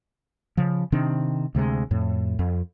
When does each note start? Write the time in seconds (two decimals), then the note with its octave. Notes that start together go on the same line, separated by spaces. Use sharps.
0.57 C#3 F3
0.92 C3 D#3 C4 D4
1.55 D2 C3 G3 G#3
1.91 F2 A2
2.39 F2